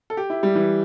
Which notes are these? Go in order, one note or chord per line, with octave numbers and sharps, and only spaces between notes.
A4
G4
E4
G3
E3